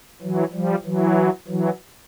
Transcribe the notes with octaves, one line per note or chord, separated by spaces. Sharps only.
E3 F#3
F3 G3
E3 F#3
E3 F#3